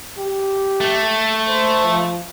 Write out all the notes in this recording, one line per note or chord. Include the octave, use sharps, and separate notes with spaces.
G4
A3
C5
F3